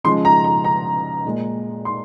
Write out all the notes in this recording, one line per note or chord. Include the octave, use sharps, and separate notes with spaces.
C#3 F3 G#3 C6
A#5
A#5
A#5
A#2 G#3
C6